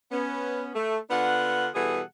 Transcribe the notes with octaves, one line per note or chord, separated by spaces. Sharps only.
B3 C#4
A3
D3 B3 D4 F4 F#5
B2 E3 G3 G#4 A4 F#5